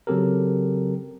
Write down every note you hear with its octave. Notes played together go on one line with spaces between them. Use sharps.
C#3 F#3 C4 G4 A4 A#4